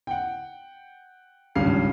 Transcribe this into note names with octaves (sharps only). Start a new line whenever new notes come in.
F#5 G5
G#1 C#2 G2 C#4 F5 C7